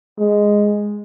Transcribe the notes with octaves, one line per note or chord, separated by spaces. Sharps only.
G#3